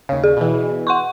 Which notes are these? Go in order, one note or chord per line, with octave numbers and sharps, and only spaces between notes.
D#2 C#3
G#4
B2 E3
F#5 C6 C#6